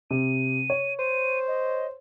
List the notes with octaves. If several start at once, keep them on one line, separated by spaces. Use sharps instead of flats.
C3 D#7
C#5
C5 D#7
D#5